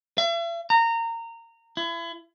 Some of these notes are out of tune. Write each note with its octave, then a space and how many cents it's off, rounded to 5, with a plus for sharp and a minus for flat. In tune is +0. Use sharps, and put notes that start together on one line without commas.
E5 +45
A#5 -20
E4 +35